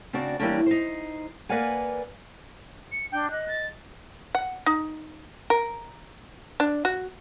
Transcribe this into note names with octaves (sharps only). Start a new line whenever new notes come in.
C#3 C4 D4 F#4 D5
E3 G3 G#3 A#3 C#4 D4
D#4 C5
A#3 B4 D5 F5 F#5 G#5
C#7
D4 G5
D#5 F#6
A6
F#5
D#4
A#4
D4
F#4